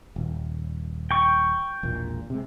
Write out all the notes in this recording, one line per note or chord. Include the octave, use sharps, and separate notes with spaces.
D#1
G5 C#6
E1 A#1 A#2
C3 G#3